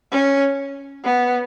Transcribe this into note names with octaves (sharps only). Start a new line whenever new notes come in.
C#4
B3